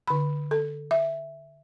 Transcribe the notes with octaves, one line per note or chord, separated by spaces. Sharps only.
D3 B5
A4
E5